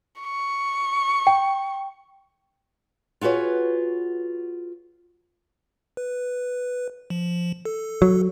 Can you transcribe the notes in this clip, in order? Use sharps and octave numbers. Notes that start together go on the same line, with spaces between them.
C#6
G5
F4 F#4 G#4 B4 C#5
B4
F3
A4
F#3